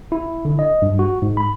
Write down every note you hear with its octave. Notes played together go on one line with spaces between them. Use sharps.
E4
D3
D#5
G2
F#4
G#2
B5